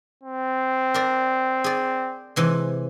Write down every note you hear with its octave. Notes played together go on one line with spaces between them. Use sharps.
C4
A#4 D5
G#4 D5
C3 E3 G#3